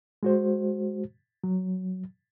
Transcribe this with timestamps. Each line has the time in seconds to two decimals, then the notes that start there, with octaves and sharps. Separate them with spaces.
0.23 G#3 F#4 C5
1.44 F#3